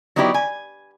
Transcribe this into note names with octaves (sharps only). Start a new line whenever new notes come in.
F#3 B3 D#4 E4 G4 D5
G#5